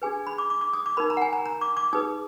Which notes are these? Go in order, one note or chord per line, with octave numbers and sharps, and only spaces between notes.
D4 G#4 B4 G#5
B5
D6
D6
D6
D#6
D6
D#4 A#4 B5
A#5
F#5
G#5
A#5
A#5
D6
D6
D#4 G#4 B4 D#6